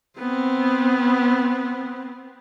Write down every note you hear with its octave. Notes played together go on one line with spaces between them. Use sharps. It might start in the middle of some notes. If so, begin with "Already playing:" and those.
B3 C4